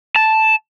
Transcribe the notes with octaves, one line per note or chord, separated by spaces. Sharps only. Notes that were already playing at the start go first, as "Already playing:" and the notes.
A5